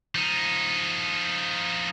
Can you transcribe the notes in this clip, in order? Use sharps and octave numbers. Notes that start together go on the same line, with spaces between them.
F3 D#4